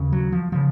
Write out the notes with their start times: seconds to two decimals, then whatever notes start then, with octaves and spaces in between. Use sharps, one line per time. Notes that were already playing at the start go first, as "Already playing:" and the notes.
Already playing: D#2 C#3
0.12 F#3
0.32 F3
0.52 C#3 F3